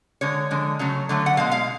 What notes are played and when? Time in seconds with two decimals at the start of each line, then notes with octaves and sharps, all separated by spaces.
0.21 D3 G#3 C#5
0.51 D3 F3 G#3
0.79 C#3 F#3 A3
1.09 D3 F#3 A3
1.26 F#5
1.37 B2 G#3 F5
1.52 F5